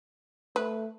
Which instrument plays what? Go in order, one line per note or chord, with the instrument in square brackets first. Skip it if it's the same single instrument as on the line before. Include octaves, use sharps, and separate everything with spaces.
[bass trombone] A3 [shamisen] B4